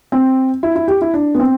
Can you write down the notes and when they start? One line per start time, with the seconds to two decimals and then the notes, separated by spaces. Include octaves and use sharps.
0.12 C4
0.63 E4
0.76 E4
0.88 G4
1.02 E4
1.14 D4
1.35 B3
1.40 C4